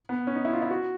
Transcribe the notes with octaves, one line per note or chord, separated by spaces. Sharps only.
B3
C#4
D#4
E4
F4
E4
F#4